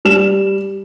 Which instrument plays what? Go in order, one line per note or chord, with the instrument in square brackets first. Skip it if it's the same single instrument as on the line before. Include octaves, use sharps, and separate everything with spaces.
[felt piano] G3 E7